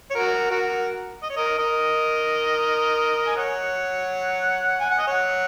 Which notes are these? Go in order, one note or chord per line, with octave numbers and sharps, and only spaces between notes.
C#5
F#4 A#4
F#4 A#4
D#5
C#5
A#4 D#5
A#4 D#5
G#5
C#5 F#5
G#5
F#5
D#5
C#5 F#5